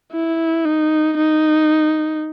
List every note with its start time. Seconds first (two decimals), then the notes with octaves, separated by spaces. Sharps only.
0.12 E4
0.65 D#4
1.17 D#4